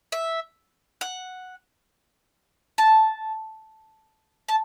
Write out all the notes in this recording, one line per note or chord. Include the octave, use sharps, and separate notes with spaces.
E5
F#5
A5
A5